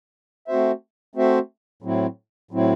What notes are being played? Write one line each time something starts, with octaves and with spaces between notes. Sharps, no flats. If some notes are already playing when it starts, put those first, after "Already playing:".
A3 C4 F#4 C5 E5
A3 C4 F#4 C5 E5
A2 F#3 C4 E4
A2 F#3 C4 E4